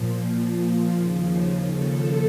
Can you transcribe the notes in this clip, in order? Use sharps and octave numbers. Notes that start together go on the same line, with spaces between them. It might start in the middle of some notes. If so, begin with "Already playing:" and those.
Already playing: A#2 F3
D#2 C#3 F3
A4